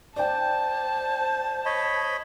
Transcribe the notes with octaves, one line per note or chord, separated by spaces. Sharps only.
C5 D5 G5 A5
C#5 D#5 B5